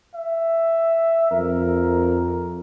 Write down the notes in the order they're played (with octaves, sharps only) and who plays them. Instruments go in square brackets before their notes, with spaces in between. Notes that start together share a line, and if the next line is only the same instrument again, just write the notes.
[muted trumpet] E5
[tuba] F2 [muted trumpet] A#4